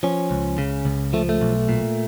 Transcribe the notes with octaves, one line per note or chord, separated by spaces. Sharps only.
F3 C#4
C#2
C#3
C#2
F3 A3
A3
B1
A#2